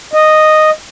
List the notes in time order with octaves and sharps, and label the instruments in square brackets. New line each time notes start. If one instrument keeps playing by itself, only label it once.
[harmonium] D#5